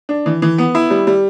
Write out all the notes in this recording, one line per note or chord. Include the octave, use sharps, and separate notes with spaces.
D4
E3
E3
B3
E4
G3
G3